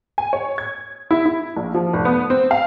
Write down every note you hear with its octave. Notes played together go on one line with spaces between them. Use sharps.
G#5
C#5
G#6
E4
E4
A#1
F3
F1
B3
C4
F5